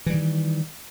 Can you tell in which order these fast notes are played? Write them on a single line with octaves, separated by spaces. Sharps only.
E3 G3 D#3